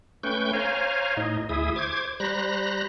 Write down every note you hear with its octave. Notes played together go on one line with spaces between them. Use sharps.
A3 C#4 B4 G5 C#6 G6
C5 C#5 F5 G#5 A#5
A2 D#4 D#5
D2 E4 G#4 E5 D#6
C5 D6 G#6
G3 C5 A#5 B5 F#6 A#6